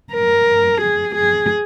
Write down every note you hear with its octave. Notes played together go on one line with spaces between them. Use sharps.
A#4
G#4
G#4